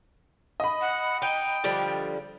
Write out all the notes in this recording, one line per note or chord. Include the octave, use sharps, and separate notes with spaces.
D#5 B5
F#5
D#4 G5
D3 F3 G3